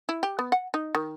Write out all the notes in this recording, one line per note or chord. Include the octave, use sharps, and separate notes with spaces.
E4
G4
B3
F#5
D#4
D#3